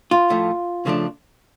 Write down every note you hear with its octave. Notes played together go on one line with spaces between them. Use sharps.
F4
A2 F3 A3
C#3 F3 A3 D4